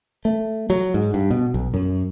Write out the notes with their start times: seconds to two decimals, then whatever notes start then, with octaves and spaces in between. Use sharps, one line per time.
0.25 A3
0.70 F#3
0.94 G#2
1.14 G2
1.31 B2
1.54 B1
1.74 F#2